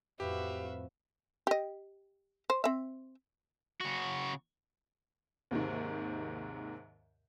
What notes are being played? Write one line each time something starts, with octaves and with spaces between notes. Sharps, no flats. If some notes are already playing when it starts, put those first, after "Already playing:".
F2 A2 F#4 G4 B4 E5 F5
G4 D#5
C5
C4 E5
C#3 F#4
D#2 G#2 C3 D#3